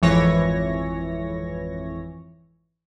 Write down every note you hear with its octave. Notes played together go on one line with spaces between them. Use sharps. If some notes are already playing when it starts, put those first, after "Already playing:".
G#1 F2 E3 C#5 A#6